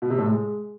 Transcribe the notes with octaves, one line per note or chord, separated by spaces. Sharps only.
B2
C3
A2
G#3